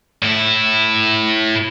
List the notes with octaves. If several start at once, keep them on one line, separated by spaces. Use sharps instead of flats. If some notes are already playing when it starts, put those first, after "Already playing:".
A2 E4